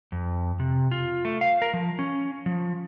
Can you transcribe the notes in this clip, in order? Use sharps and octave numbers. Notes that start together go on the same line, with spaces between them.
F2
C3
F4
A3
F5
A#4
F3
C#4
F3